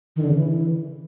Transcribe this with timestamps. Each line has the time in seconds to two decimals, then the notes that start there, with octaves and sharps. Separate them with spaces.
0.16 D#3
0.22 D3
0.29 C#3
0.35 E3